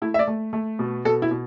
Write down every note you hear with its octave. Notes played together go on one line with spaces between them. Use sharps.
A3 E4
E5
D5
A3
A3
B2
B2 A4
E4
B2